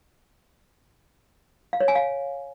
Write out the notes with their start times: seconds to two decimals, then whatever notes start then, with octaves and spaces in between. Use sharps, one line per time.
1.73 F5
1.81 C#5
1.88 G#5
1.96 F5